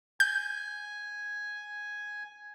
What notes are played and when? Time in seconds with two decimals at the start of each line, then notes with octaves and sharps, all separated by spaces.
0.20 G#5 G6